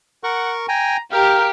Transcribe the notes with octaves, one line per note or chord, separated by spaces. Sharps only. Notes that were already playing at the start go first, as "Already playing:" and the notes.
A#4 F#5 C#6
G5 G#5 A#5
G4 A#4 F5 G5